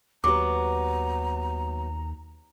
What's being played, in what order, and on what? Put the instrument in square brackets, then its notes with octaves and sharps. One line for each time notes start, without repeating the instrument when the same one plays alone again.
[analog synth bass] D#2 [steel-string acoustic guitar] F#3 B3 [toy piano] G4 D6 [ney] A#5